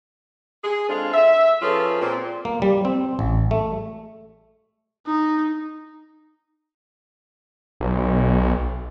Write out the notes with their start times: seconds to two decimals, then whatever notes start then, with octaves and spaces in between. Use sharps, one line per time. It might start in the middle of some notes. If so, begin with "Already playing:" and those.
0.64 G#4
0.89 G#3 C4 D4 F4 A4 F5
1.13 E5
1.62 F3 C#4 F4 G#4 A4 B4
2.01 A#2 C4
2.45 A#3
2.62 G3
2.85 C4
3.19 A1
3.51 A3
5.07 D#4
7.80 B1